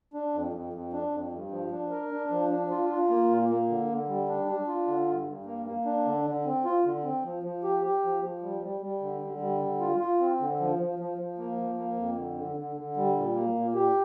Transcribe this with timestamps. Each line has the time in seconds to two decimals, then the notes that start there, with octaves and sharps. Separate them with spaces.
0.14 D4
0.34 F2
0.53 F2
0.73 F2
0.93 D4
1.12 F2
1.32 G2
1.51 F3
1.71 D4
1.91 A#4
2.12 D4
2.30 F3
2.50 D4
2.71 F4
2.89 F4
3.10 A#3
3.29 A#2
3.49 A#3
3.69 D3
3.89 D3
4.08 G3
4.29 D4
4.48 D4
4.68 F4
4.87 D3
5.07 G2
5.27 G2
5.46 A#3
5.66 A#3
5.85 D4
6.05 D3
6.25 D3
6.45 C4
6.65 F4
6.85 D3
7.04 C4
7.24 F3
7.43 F3
7.63 G4
7.83 G4
8.03 F3
8.22 F3
8.42 G3
8.62 G3
8.82 G3
9.01 D3
9.21 D3
9.40 G3
9.61 D3
9.81 F4
10.00 F4
10.19 C4
10.40 D3
10.60 F3
10.79 F3
10.99 F3
11.18 F3
11.38 A#3
11.57 F3
11.78 A#3
11.97 F2
12.16 D3
12.37 D3
12.56 D3
12.76 D3
12.96 G3
13.16 A#2
13.36 A#3
13.55 A#2
13.75 G4